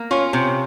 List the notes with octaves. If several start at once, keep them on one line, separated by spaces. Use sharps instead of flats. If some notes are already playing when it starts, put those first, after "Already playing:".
Already playing: A#3
C#4 F4
C3